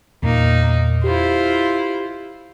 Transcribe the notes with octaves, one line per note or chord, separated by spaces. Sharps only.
E2 A#2 A#3 D#4
E4 F4 G4 C5